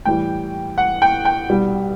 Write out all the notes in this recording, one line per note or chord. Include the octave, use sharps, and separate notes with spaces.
A2 E3 G3 G5
F#5
G5
G5
C2 B2 G3